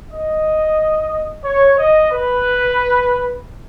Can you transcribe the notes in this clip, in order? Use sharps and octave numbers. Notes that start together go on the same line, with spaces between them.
D#5
C#5
D#5
B4